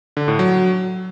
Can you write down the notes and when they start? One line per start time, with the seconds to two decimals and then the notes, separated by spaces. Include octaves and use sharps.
0.17 D3
0.28 A2
0.39 F#3